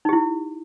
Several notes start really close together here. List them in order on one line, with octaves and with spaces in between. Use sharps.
D#4 G4 E4